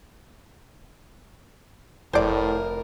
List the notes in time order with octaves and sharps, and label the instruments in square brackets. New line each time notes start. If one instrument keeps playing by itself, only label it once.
[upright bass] F1 [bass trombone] A2 [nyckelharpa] A#4 [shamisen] C5 D5